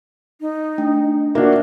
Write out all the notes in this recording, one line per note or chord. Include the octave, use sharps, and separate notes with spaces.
D#4
A3 D4 G5
A#3 D4 F#4 E5